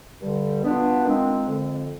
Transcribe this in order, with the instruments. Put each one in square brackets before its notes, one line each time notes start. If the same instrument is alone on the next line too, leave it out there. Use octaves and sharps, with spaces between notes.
[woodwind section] G2 D3 G3
B2 B3 D4 F4
D#3 G#3 C4 F4
F2 D3 G#3 C4